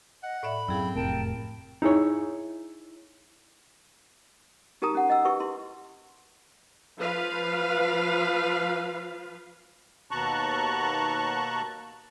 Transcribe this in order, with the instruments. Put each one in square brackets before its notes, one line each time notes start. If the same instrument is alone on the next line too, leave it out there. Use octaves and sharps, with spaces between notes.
[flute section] D#5 [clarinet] F#5
[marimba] A2 D5 E5 [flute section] B5
[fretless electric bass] F#2 [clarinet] C4 [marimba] E4 G#4 F5
[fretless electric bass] F1 A2 C3 [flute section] A#4 G5 A5
[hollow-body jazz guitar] D#4 E4 G#4 C#5
[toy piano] D#4 G4 A#4 A5 A#5 D#6
C#4 F#5
D#5 F#5 E6
E4 G4 B4 C#6
E4 C6
[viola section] F3 B4 F5
[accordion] D#2 B2 A5 A#5 C#6 F#6